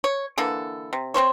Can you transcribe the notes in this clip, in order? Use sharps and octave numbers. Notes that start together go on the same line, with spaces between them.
C#5
D3 E3 A#3 A4
C3
C4 C#4 C5 C#5